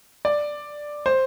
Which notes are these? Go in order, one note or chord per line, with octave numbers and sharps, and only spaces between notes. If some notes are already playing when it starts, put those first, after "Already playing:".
D5
C5